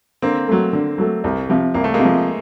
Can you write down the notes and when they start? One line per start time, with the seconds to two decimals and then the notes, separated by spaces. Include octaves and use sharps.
0.22 D3 A#3 C4
0.48 F#3 A3
0.73 D3
0.98 F#3 A3
1.24 C2
1.49 C3 F3
1.74 C2 A#3
1.84 A3
1.94 G#3 A#3
2.00 C3 F3